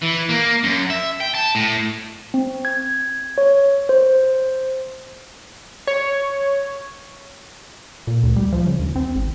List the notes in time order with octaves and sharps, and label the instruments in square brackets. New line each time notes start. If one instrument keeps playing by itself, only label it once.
[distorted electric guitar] E3
A#3
F#2
E5
G5
A5
A2
[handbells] C4
G#6
C#5
C5
[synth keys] C#5
[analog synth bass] A#2
D2
G3
F3
C#3
D#2
C4
G#1